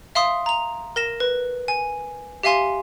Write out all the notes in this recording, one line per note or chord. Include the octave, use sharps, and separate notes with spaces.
E5 F5 C6 D#6
A#5 F7
A#4 A#6 E7
B4
G#5
G4 E5 F5 G#5 C6